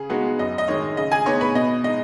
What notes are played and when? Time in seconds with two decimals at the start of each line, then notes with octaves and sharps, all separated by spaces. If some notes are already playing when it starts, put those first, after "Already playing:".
Already playing: C#3 G#4
0.10 G#3 B3 D#4 F#4 F#5
0.39 F#2 D#5
0.58 D#5
0.68 D#3 G#3 C#5
0.97 C#3 D#5
1.12 G#4 G#5
1.26 B3 D#4 C#5 C#6
1.41 B4 B5
1.55 B2 D#5
1.84 G#3 D#4 D#5